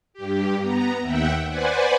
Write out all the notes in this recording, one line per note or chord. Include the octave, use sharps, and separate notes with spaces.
G2 G4
B3 A#5
D#2 E5 F#5 G5
B4 C5 D5 F#5 G#5